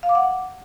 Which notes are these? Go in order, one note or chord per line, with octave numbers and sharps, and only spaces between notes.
F5
D6
F#5